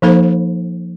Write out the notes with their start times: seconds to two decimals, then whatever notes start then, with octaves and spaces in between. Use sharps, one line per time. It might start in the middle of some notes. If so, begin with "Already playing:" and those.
0.02 F3 A#3 D#4 A4 C5